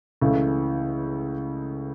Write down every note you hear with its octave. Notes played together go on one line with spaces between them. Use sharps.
C#2 C#3 E3 A3